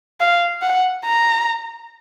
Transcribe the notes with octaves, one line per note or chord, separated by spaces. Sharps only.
F5
F#5
A#5